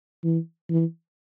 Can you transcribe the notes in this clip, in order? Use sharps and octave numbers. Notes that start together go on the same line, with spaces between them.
E3
E3